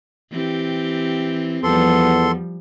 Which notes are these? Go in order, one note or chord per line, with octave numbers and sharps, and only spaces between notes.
E3 C4 G4
E2 F3 G3 B3 A4 C6